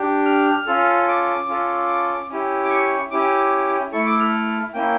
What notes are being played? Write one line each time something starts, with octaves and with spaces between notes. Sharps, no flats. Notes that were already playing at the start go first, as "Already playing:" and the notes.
Already playing: D4 G4
F6
C#4 F4 A4
D6
C#4 F4 A4
C#4 E4 G4
D6
C#6
C#4 E4 G4 D6
A3 E4 A4 C#6
D6
F6
A#3 C#4 E4 G5